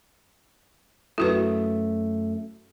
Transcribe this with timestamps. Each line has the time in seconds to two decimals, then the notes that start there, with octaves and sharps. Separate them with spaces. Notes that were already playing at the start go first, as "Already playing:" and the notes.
1.18 F#2 A3 E4 F#4 B4